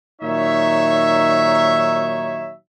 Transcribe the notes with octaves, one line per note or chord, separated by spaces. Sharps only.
A#2 D#3 F#3 D#4 C#5 E5